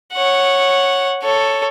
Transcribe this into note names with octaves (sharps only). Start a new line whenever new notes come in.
C#5 F#5
A4 C#5